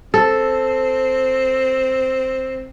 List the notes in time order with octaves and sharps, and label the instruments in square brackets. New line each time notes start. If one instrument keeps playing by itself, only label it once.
[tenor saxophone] C4 [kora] A4